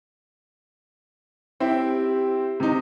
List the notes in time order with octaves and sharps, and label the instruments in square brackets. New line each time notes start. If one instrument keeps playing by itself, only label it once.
[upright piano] C4 E4 [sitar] G4
[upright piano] C3 D#4